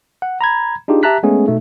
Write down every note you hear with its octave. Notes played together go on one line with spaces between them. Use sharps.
F#5
A#5 B5 G#6
D4 D#4 F4 G4 G#4
G4 E5 A5 A#5 F#6 B6
G#3 A3 B3 C#4 G#4
B2 A3 D#4